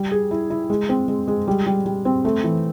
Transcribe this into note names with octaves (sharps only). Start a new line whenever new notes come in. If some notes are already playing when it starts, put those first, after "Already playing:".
Already playing: G3
G#4
E4
E4
G#3
C4
G#3
G#3
G3
G3
G3
C4
A3
E3